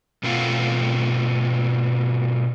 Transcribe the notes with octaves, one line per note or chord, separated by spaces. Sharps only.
B2 A3 C4 F4 F5 F#5